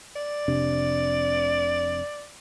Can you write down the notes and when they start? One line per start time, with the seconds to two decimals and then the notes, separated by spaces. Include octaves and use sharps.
0.16 D5
0.48 F1 C3 D4